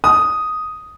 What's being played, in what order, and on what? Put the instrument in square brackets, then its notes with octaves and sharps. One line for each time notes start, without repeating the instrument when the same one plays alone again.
[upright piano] D#6